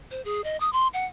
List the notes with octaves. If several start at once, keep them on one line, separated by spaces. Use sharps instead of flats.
C5
G#4
D#5
D#6
C6
F#5